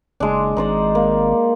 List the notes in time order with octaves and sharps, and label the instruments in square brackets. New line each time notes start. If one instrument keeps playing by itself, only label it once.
[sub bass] F#1 [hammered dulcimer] G#3 D4
[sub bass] G#1 [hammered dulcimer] D#4 C5 D5
[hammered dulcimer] A#3